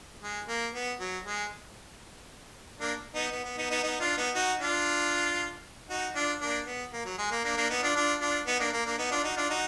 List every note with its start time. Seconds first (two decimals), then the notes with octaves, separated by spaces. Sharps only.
0.22 G#3
0.48 A#3
0.74 B3
1.00 F#3
1.26 G#3
2.80 A#3 D4
3.15 B3 D#4
3.32 B3
3.45 B3
3.57 B3 D#4
3.70 B3 D#4
3.83 B3 D#4
4.00 D4 F4
4.17 B3 D#4
4.35 D#4 F#4
4.61 D4 F4
5.90 D#4 F#4
6.15 D4 F4
6.41 A#3 D4
6.66 B3
6.93 A#3
7.05 F#3
7.18 G#3
7.31 A#3
7.44 A#3 D4
7.57 A#3 D4
7.70 B3 D#4
7.83 D4 F4
7.95 D4 F4
8.21 D4 F4
8.47 B3 D#4
8.60 A#3 D4
8.73 A#3
8.86 A#3 D4
8.99 B3 D#4
9.12 D4 F4
9.24 D#4 F#4
9.37 D4 F4
9.50 D#4 F#4